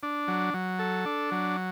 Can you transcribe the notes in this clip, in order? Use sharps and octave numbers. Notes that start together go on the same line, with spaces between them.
D4
F#3
F#3
A4
D4
F#3